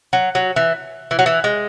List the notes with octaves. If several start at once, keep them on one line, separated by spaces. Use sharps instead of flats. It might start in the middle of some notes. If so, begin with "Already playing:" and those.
F#3
F#3
E3
E3
F#3
E3
G#3